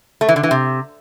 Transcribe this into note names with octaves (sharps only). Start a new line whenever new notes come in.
A3
E3
D3
E3
C3